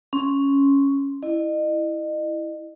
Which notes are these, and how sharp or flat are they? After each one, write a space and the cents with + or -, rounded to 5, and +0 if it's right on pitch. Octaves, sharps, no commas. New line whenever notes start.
C#4 +0 C6 +0
E4 +0 D#5 -35